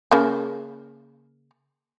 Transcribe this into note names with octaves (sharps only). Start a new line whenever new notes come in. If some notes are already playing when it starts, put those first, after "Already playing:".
C#3 A#3